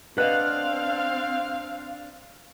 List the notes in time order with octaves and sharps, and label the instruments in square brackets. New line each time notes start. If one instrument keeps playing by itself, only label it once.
[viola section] C4 F5 [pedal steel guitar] D4 F#5 [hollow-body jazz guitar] B4 D#5